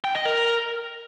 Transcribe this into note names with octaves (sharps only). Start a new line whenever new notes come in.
G5
D#5
A#4